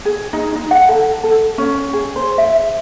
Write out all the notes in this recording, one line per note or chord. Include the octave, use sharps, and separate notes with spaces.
G#4
D#4
D#4
F#5
A4
A4
C#4
G#4
C5
E5